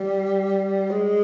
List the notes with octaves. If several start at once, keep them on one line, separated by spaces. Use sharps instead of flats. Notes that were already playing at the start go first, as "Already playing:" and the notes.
Already playing: G3
G#3